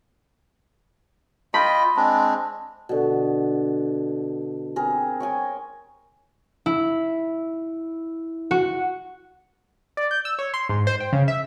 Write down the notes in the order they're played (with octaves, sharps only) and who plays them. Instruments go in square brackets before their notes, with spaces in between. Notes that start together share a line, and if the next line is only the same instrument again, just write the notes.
[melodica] F4 D#5 G5 [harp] B5
[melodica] G#3 C4 D4
[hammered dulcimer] B2 D3
C4 G#4 A#4
C#5 G5 G#5 A#5
[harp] E4
F#4
[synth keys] D5
G6
E6
C#5
C6
G#2
C5
G5
C#3
E5